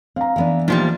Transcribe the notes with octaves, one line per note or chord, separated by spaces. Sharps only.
C4 F5 A#5
E3 B3 D4
A#1 D#3 F3 G3